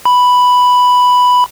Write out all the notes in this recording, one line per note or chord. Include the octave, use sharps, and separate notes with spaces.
B5